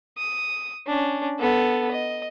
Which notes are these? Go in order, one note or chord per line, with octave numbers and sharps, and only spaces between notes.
D#6
C#4 D4
B3 A4
D#5